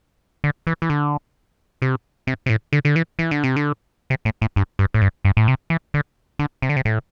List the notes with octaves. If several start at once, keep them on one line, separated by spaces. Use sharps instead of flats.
D3
E3
E3
D3
C3
C3
C3
A2
D3
D3
E3
E3
D3
C3
D3
C3
A2
A2
G2
G2
A2
G2
G2
A2
C3
E3
D3
D3
C3
D3
C3
A2